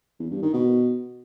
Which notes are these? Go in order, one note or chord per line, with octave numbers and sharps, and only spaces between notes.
E2
G2
D#3
B2